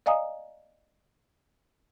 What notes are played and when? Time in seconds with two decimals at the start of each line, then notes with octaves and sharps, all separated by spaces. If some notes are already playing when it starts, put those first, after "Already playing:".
0.06 D5 D#5 F5 G#5 A#5 D#6